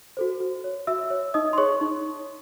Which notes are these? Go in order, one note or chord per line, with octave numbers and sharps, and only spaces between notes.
F#4 A4 C5
F#4
C#5
F#4 E5 E6
C#5
D#4 D#5 D#6
C6
G#4 C#5 C#6
D#4